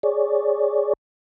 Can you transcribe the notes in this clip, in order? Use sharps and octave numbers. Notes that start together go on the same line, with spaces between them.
G#4 C#5 D5